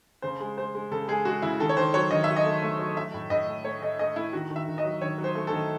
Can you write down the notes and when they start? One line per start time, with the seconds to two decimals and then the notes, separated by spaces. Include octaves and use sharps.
0.22 C#3 C5
0.40 G#3
0.57 G#3 C5
0.75 G#3
0.91 C#3 A4
1.08 G#3 G#4
1.25 G#3 F#4
1.42 C#3 E4
1.60 D#3 A4
1.69 C#5
1.77 D#3 C5
1.94 F#3 C#5
2.11 D#3 D#5
2.24 F#3 E5
2.36 D#5
2.45 A3
2.63 A3
2.79 F#3
2.97 F#3 E5
3.14 A2
3.30 A2 D#5
3.48 A3
3.64 A3 C#5
3.82 A3 D#5
3.99 A3 D#5
4.16 A3 E4
4.33 D#3 F#4
4.51 D#3
4.56 E5
4.68 D#3
4.78 D#5
4.84 F#3
5.01 D#3 C#5
5.18 F#3
5.24 C5
5.35 A3
5.47 A4
5.52 D#3